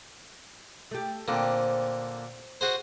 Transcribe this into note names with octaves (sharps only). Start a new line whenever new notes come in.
A3 G4
A#2 D3 C4
F#4 G#4 C5